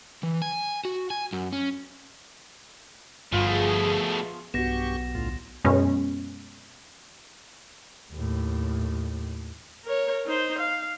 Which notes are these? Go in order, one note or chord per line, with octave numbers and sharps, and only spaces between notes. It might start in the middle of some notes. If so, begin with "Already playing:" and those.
E3
G#5
F#4
G#5
F#2
C#4
G1 G2 B2 F3 A3 F4 G#4
B1 G2 B3 F#4 G4 C#6 A#6 E7
D2 A2 F4
F#2 B2 G#3 C#4
D#2 A2
A#4 C#5
D#4 C5
F5